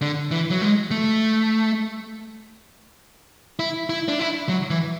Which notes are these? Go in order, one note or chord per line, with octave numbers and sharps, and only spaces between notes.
D3
E3
F#3
G#3
A3
E4
E4
D4
E4
F#3
E3